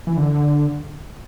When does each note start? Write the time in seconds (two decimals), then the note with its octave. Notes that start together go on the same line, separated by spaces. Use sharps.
0.07 E3
0.17 D3